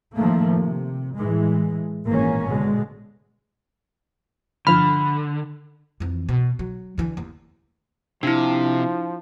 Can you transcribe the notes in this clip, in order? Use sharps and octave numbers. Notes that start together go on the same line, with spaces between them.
A2 D#3 F3 A3 A#3
C3
A2 E3 G#3
G#1 A#2 E3 A#3 C#4
B2 D3 G#3
G1 D3 F3 B5 F6
F2 E3
B2
F#3
D3 E3
D#2
C3 F3 D4 E4